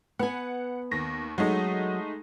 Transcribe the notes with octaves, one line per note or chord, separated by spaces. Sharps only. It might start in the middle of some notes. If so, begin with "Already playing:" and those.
B3 F#5 G#5
D#2 A#6
F#3 G#3 A3 D#4